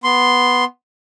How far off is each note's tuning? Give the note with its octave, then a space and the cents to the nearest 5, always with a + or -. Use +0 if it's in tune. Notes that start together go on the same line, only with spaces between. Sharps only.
B3 +0 C6 -5